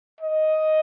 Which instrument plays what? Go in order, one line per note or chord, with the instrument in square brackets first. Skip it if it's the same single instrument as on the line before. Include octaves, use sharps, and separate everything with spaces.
[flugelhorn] D#5